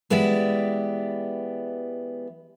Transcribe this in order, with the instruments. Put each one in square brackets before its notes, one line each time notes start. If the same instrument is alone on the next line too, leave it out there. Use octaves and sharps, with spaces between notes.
[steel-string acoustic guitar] E3 G#3 B3 G4 D5 E5